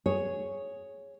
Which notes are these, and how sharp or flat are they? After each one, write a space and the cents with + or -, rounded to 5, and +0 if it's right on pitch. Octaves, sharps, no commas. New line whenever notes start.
G#4 +0 C#5 +0